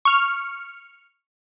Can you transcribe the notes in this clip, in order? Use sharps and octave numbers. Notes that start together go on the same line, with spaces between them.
C#6 F6